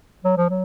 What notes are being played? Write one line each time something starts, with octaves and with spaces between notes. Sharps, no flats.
F#3
F3
F#3